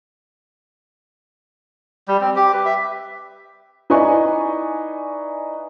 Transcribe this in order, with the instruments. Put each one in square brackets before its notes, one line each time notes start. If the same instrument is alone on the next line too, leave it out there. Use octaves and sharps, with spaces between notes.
[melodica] G3
C4
G4
B4
E5
[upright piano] D#4 E4 B4 D5 G#5 C#6